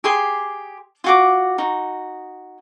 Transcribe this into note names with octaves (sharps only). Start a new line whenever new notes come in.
G4 G#4 C6
F4 F#4 D6
D#4 F#4